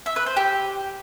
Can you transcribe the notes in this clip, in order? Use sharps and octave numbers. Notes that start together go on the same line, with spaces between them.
E5
B4
C5
G4